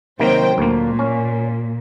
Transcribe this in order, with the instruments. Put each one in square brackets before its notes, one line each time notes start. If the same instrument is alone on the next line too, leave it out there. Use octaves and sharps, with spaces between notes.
[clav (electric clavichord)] C3 D#3 A#3 [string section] F#3 C5 G5
[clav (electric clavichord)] D2 A#3 [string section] A#2
[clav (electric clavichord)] C#4